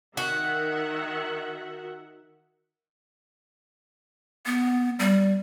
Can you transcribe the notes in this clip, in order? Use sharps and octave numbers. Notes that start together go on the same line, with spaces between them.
D#3 F#4 E5 F#5
B3
G3